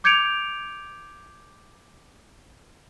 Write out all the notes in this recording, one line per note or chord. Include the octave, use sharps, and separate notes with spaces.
D6 G6 G#6 C#7 D7 F7